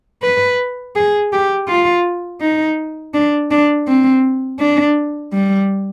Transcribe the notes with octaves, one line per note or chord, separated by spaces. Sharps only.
B4
G#4
G4
F4
D#4
D4
D4
C4
D4
G3